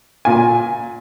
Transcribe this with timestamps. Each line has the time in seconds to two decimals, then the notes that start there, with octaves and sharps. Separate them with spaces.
0.25 A#2 G#5